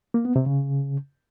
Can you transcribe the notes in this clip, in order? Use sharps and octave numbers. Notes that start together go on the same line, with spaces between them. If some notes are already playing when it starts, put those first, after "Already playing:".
A#3
B3
C3
C#3